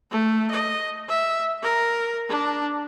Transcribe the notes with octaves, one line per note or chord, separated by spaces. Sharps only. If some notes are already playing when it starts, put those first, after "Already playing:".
A3
D#5
E5
A#4
D4